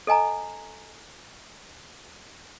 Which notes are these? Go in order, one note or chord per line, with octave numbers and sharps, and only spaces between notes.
A4 D#5 G#5 A#5